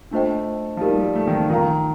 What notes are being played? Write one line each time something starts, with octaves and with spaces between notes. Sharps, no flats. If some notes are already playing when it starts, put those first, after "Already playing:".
A3 D4 F4 C5 D#5 G5
F3
G3 D#4 G4 A#4
G3
A3
D#3
F3
D#3 F4 A#4 F5 A#5